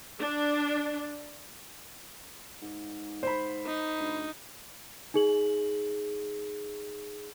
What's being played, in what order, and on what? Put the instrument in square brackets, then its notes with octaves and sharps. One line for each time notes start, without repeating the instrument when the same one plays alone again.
[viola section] D4
[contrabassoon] G#2
[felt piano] C5 B5
[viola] D#4
[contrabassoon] D2
[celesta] D#4 G#4 F#7